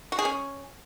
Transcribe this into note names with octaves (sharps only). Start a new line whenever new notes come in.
F#4
G#4
C#4